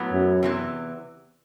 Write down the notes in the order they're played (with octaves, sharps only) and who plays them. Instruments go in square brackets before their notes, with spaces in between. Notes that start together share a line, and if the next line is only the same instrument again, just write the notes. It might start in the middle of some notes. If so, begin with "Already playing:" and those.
Already playing: [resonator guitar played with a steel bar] A2 F#3 B3
[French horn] F#2
[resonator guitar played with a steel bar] E2 C3 E3